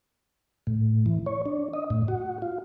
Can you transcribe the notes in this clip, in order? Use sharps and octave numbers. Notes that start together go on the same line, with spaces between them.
A2
E3
C#5
D4
D#5
A2
F#4
F4